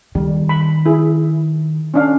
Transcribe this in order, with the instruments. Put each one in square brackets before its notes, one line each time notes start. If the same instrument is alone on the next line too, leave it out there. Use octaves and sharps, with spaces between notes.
[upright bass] D#3 [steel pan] G3
[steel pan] B5
E4 G#4
C#4 D4 F5